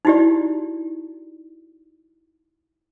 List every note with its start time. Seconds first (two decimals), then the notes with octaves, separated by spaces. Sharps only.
0.05 D#4 E4 F#4 G4 D5